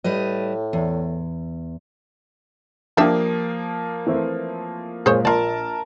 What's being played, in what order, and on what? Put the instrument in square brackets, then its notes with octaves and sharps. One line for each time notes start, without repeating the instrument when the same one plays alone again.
[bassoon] A2 [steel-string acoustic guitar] G3 B4 D#5
[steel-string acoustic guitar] E2
[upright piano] F3 A#3 [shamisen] G3 D4 E5 [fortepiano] G5 D#6
[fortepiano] E3 A3 C4
[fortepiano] A#2 G#3 F4 [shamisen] G#4 C5 C#5
[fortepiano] A#1 [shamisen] F4 D5 [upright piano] A#4 A5